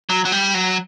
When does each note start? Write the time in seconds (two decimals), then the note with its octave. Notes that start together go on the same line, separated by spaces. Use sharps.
0.10 F#3
0.25 F#3
0.32 G3
0.54 F#3